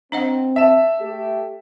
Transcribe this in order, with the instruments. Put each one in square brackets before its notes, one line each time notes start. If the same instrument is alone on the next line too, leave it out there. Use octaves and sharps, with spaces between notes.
[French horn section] C4 [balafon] D4 D#5 F#5
[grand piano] E5 A5 E7
[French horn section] A3 G4 A4